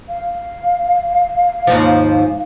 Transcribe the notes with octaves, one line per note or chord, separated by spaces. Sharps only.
F5
D#2 G#2 F3